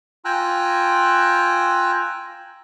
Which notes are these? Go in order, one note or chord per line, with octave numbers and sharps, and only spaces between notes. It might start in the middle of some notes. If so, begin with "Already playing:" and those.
F4 G5 G#5 A#5 E6 F#6